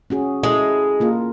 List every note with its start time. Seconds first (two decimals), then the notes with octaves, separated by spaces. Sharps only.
0.10 C#4 F#4 G#4
0.43 G#3 E4 A4
1.00 A#3 F4 A#4